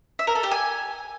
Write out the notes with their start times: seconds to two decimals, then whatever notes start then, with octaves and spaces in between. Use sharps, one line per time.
0.19 E5
0.27 A#4
0.35 A4
0.43 G4
0.51 G#5